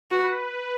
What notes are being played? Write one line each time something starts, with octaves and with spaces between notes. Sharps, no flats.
F#4 B4